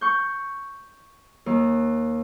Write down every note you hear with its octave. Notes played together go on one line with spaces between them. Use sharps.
C#6 G6
D#2